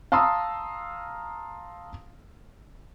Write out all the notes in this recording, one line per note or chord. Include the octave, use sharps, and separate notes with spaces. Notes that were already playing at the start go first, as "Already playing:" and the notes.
F5 A5 A#5 C6 D#6 E6